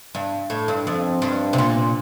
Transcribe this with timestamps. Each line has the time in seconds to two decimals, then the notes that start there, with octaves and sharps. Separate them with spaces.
0.15 G2
0.50 A2
0.68 G2
0.87 F2
1.22 G2
1.53 C3
1.58 A#2